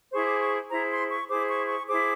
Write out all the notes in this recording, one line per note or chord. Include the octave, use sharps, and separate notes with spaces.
E4 G#4 C5 C#6
D6
C#6
E4 G#4 C5 A#5
C6
C#6
E4 G#4 C5 D6
C#6
C#6
E4 G#4 C5 D6